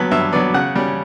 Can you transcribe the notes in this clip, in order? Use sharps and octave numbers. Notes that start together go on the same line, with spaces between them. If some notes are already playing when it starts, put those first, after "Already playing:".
Already playing: G2 F#3 B3 B5
G2 E5
F#3 B3 D5
C#3 F#5
G3 C#4